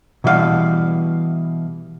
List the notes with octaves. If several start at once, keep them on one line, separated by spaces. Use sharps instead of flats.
B2 E3 G3 F#4 F5 F#5